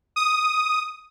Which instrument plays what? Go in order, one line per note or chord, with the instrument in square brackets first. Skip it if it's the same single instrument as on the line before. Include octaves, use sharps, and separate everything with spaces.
[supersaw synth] D#6